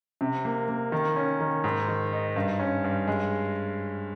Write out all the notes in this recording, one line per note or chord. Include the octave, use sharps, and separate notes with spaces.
C3
A#3
A#3
D#3
C#4
D#3
G#2
D#3
D#4
G2
C#4
G2
G#3